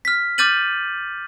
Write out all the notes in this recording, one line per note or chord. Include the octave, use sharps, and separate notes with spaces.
F6 B6
D6 F6 G6 A6 D#7 F#7